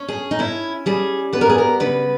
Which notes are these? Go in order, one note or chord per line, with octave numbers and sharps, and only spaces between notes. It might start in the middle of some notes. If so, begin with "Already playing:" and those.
Already playing: C#4
G#4
D#4
C#4 E4
G3 G#4
B3 B4
A#4
G#4
A#4
C#3 B4